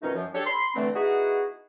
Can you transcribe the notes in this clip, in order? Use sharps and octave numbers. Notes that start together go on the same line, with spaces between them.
F2 B2 D#3 A3 C#4 D#4
F#2 F3
D4 G4 A4 C#5
B5 C6
D3 E3 A3 C4
B3 D#4 E4 F#4 G#4